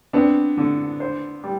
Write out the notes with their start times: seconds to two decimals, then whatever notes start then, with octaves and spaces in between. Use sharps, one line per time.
0.13 B3 C4 D4
0.57 D3
1.00 C5
1.43 G3